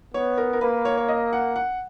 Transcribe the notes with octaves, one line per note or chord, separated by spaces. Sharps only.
B3 C#5
A#4
A#4
A#3 B4
C#5
C#5
D#5
F#5
F#5